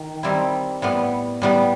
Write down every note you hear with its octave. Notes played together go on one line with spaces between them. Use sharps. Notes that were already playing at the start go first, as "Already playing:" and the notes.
Already playing: D#3
D#3 G3 C4 E4
A2 G3 B3
A2 G3 B3